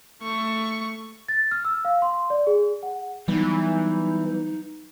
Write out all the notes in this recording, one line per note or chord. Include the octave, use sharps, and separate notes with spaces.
A3 C#6
A6
F6
E6
F5
C6
D5
G#4
F#5
E3 F#3 G3 B3 D#4